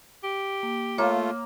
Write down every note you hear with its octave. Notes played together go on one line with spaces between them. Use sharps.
G4
A#3
A3 A#3 F4 C#5